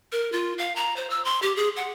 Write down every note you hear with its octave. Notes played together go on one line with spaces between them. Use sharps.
A#4
F4
F5
A#5
C5
E6
C6
G4
G#4
F#5